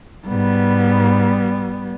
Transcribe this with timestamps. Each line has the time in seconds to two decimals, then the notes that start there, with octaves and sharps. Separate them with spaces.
0.27 G#2 G3 B3